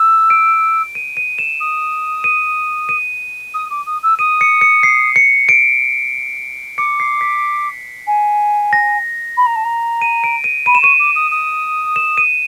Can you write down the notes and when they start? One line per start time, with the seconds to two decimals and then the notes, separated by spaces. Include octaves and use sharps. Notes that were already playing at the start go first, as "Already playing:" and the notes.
Already playing: E6
0.30 D7
0.95 D#7
1.17 D#7
1.38 E7
1.60 D#6
2.24 D#7
2.89 D#7
3.54 D#6
3.70 D6
3.86 D#6
4.03 E6
4.19 D#6 D#7
4.41 C#7
4.61 C#7
4.83 C7
5.16 C#7
5.49 D7
6.78 D6 C#7
7.00 C7
7.21 B6
8.07 G#5
8.73 A#6
9.37 B5
9.46 A#5
9.56 A5
9.64 A#5
10.02 D#7
10.24 D7
10.44 D#7
10.66 B5 D#7
10.75 E7
10.82 C#6 D#7
10.99 D6
11.15 D#6
11.31 D#6
11.96 E7
12.17 D#7